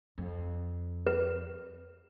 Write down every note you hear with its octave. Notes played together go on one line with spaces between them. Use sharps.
F2
B4